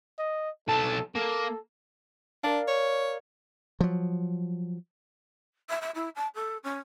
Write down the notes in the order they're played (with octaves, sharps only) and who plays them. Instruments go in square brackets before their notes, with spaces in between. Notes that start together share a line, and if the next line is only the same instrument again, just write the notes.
[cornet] D#5
[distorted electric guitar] B1 A5 [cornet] A4
[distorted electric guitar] A#3 [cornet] A4
[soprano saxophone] D4 [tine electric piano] A#4 D5 F5
[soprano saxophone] C#5
[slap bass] F3 F#3
[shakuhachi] E5
E5
E4
A5
A4
C#4